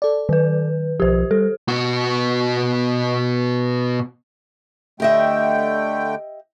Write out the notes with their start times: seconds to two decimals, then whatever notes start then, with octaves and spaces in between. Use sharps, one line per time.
0.02 A4 D5
0.29 D#3 B4
1.00 B1 F3 G4 C5
1.31 G3 A4
1.68 B2 F#4
5.00 D3 A3 G4 D#5 E5 G5